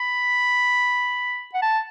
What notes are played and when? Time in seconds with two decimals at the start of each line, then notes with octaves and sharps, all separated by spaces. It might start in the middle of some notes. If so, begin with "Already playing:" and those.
Already playing: B5
1.54 F#5
1.62 A5